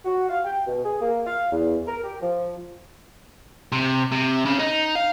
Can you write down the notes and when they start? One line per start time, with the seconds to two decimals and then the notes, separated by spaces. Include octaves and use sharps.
0.05 F#4
0.28 F5
0.45 G5
0.67 B2
0.84 G#4
1.00 A#3
1.25 F5
1.51 E2
1.86 A#4
2.03 G4
2.20 F3
3.72 C3
4.12 C3
4.46 C#3
4.59 D#4
4.95 F5